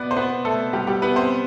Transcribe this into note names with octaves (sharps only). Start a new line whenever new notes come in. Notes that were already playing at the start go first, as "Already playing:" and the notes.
Already playing: B2 B3 B4 D5
C5
B3 B4
A3 A4
G3 G4
G3 G4
B3 B4
C4 C5